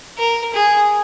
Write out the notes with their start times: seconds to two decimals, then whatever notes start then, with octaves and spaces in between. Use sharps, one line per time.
0.18 A#4
0.54 G#4